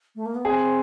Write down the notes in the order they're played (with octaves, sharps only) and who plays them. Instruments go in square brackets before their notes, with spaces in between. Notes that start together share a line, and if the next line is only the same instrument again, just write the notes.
[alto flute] A3
A#3
B3
[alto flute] C4 [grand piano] G#4